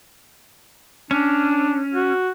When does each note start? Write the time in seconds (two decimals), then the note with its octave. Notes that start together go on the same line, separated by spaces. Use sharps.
1.11 C#4 D4
1.94 F#4